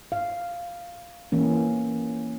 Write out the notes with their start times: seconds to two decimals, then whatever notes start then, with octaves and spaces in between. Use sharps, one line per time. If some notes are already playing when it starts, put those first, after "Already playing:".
0.12 F5
1.32 E3 A#3 C#4